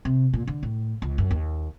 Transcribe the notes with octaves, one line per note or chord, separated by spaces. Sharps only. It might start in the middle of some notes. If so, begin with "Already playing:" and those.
C3
A#2
D3
A2
C#2
F#2
D#2